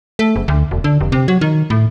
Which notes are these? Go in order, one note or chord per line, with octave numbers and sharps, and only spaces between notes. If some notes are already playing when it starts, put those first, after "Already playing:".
A3
F#1
D2
E1
D3
F1
C3
F#3
D#3
A2